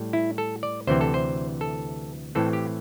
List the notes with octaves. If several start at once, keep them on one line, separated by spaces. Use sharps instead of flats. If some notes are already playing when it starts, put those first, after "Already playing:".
Already playing: A2 G3
E4
A4
D5
D2 C3 E3 C4 C5
A4
C5
A4
A2 E3 C4 A4
G4